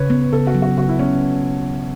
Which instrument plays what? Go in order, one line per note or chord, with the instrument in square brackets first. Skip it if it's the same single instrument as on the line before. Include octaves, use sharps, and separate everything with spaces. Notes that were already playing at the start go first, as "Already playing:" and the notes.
Already playing: [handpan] C#3 [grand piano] B4 C#5
[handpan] B3
[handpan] C#3 [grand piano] A4
[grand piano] F#4
[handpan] F#3
[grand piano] F#4
[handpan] C#3 [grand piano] F#4
[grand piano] E4
[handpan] B3 [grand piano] C#4